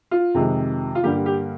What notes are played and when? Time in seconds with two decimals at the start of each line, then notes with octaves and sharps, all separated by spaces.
0.11 F4
0.35 F2 C3 D#3 G#3
0.95 F4
1.03 G2 D3 G3 A#3 G4
1.26 G4